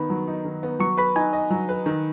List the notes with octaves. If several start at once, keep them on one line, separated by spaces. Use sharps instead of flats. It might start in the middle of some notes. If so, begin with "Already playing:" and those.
Already playing: D#3 B3 B5
F#3
D#4
D#3
B3
F#3 C#6
B4 B5
D#4 G#5
D#5
F#3
B4
D#3